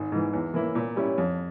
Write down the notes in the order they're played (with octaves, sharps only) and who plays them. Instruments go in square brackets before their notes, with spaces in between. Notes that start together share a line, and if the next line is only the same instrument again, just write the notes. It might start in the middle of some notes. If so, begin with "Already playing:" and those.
Already playing: [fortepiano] G#1
G#2 E3
E2
E3 A#3 E4
A#2
G3 C#4 E4
F2